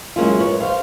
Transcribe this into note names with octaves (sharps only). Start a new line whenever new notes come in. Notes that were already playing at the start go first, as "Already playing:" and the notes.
F#3 G#3 A#3 C#4 E4 F4
B4 C#5
C5 F5